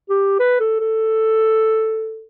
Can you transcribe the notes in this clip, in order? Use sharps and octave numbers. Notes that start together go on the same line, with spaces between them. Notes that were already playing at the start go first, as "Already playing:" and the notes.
G4
B4
A4
A4